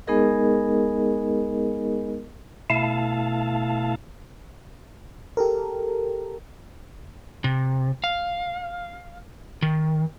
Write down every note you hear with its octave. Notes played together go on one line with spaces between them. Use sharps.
G#3 B3 D#4 G#4 A#4 D#5
B2 A3 E4 F5 A5
G4 A4 A#4
C3
F5
D#3